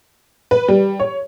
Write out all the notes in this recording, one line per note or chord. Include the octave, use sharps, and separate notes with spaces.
B4
G3
C#5